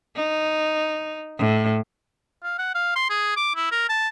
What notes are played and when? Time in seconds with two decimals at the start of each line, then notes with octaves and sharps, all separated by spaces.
0.16 D#4
1.39 A2
2.43 F5
2.58 F#5
2.74 F5
2.96 C6
3.10 G#4
3.36 D6
3.55 E4
3.71 A#4
3.89 A5